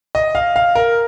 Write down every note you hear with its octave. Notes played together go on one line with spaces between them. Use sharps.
D#5
F5
F5
A#4